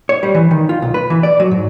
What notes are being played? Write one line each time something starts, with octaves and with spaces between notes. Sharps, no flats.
C#5
G3
E3
D#3
F4
B1
B4
E3
D5
F#3
G#2